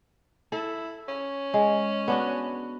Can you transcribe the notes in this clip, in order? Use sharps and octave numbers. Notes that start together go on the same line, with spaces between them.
E4 A4
C#4
G#3
B3 D4 F#4